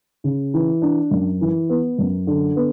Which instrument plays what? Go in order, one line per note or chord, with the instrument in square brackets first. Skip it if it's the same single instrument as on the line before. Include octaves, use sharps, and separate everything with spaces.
[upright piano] C#3
E3
D4
F#2
E3
B3
F#2
D3
B3